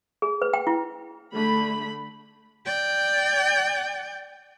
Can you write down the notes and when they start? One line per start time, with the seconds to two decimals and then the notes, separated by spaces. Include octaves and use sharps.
0.22 G#4
0.42 B4
0.54 G5
0.67 E4
1.33 D3 A3 B5
2.66 D5 G5